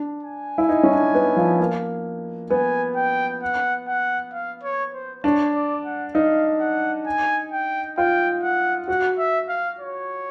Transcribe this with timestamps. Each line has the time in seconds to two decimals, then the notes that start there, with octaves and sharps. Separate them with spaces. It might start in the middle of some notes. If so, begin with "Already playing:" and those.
Already playing: D4
0.23 G#5
0.58 E4
0.69 D#4
0.83 C#4
0.92 D4
1.15 B3
1.36 F3
1.60 A#3
2.50 B3 G#5
2.96 G5
3.42 F#5
3.88 F#5
4.33 F5
4.63 C#5
4.94 C5
5.24 D4 C#5
5.54 D5
5.85 F#5
6.15 D#4 F5
6.60 F#5
7.07 G#5
7.52 G5
7.97 F4 G5
8.43 F#5
8.88 F#4 F#5
9.18 E5
9.49 F5
9.80 C#5